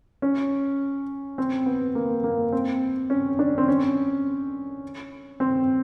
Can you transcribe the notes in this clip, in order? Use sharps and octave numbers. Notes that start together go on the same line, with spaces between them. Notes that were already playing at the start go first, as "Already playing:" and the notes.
C#4
C4
B3
A#3
A#3
C4
C#4
D4
C4
C#4
C4